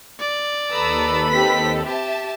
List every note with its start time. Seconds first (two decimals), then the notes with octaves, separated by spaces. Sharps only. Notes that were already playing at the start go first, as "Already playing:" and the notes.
0.20 D5
0.71 D#2 A4 B4 A#5 B5 D#6 E6
1.30 C4 G4 D#5 B6
1.85 G4 E5 A5